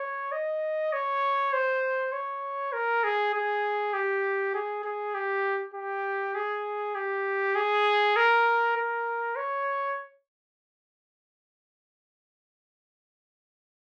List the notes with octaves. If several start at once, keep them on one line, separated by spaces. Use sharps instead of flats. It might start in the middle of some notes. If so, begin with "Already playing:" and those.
Already playing: C#5
D#5
C#5
C5
C#5
A#4
G#4
G#4
G4
G#4
G#4
G4
G4
G#4
G4
G#4
A#4
A#4
C#5